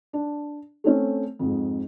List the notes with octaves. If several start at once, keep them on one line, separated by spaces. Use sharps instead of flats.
D4
A3 C4 C#4
F2 G#2